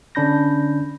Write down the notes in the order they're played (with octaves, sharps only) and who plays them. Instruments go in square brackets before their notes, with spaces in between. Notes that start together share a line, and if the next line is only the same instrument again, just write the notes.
[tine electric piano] D3 C#4 D4 B5 G6 A#6